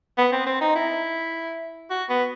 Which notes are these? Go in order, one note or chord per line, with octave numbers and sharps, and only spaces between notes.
B3
C4
C4
D#4
E4
F#4
B3